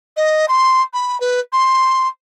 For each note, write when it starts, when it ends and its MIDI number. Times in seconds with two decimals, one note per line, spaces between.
0.16 0.46 75
0.48 0.82 84
0.93 1.17 83
1.20 1.40 71
1.52 2.08 84